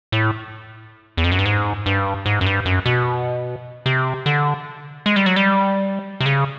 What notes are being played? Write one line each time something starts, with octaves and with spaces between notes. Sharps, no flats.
A2
E2
F2
F#2
G2
G#2
G2
G#2
F#2
G2
F#2
B2
C3
D3
G#3
G3
F#3
G3
C3
C#3